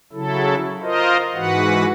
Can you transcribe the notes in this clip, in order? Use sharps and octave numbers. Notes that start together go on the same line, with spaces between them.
C#3 F#3 E4 A4
F4 A#4 C5 D#5
G#2 E3 F#4 B4 F#5